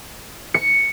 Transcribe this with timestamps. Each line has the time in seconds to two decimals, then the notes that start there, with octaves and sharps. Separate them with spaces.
0.54 C#7